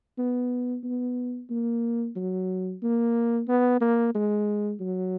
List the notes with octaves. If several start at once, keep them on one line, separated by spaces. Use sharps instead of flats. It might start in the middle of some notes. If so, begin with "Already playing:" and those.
B3
B3
A#3
F#3
A#3
B3
A#3
G#3
F#3